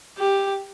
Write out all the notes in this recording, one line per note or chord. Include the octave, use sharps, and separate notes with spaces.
G4